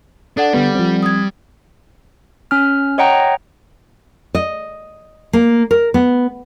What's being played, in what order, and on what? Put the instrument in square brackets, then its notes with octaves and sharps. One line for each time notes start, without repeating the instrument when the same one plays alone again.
[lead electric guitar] D4 [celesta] A4 D5 F#5
[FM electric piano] D3 B3 [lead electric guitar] G3
[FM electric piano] F3 C4
[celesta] D#6 G#6
[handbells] C#4 F6
C#5 D#5 F#5 G5 A#5
[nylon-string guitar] D#5
A#3
A#4
B3